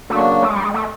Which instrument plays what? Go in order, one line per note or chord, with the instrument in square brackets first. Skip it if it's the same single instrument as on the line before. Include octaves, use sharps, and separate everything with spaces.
[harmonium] C#3 F#3 A#3 D4 F#4 [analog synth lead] A3
[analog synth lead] A3
G#3
G3
G#3
A3